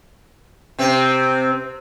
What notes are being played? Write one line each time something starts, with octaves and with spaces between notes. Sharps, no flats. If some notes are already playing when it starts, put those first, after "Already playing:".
C3 C4